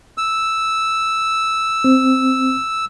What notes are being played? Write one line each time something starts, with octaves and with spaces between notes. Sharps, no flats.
E6
C4